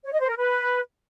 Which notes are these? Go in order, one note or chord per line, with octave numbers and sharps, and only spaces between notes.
C#5
D#5
C5
A#4
B4